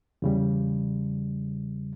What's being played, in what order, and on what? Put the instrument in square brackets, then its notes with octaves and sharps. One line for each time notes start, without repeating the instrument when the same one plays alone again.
[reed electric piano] E2 C#3 G3